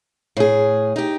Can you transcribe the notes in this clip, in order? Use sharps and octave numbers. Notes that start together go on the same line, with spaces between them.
A2 G#4
D#4 G4